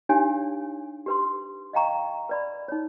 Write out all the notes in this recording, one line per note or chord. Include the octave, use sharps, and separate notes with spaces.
D4 D#4 G4 C#5 F5 G#5
G4 B4 C6
D#5 F5 G5 A#5 C#6
B4 D5 B5
D#4 C#5